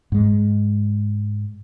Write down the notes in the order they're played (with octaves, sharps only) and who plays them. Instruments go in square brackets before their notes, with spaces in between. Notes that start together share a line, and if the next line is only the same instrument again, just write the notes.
[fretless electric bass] G#2 G#3